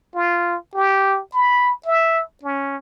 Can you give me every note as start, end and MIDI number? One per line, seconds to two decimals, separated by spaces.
0.15 0.56 65
0.75 1.20 67
1.33 1.74 83
1.86 2.23 76
2.43 2.77 61